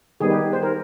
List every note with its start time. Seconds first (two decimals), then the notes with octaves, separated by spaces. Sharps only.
0.20 D#3 G3 B3 G#4
0.31 G4
0.53 C5
0.63 A#4